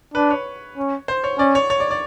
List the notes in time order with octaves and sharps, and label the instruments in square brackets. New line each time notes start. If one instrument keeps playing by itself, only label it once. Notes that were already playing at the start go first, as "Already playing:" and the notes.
[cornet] D4 [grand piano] B4
[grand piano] C#5
[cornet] C#4
[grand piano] C5
C#5
[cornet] C#4 [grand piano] D5
[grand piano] C#5
C#5
D5
D5